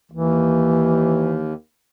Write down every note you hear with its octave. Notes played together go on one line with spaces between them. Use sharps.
D#2 E3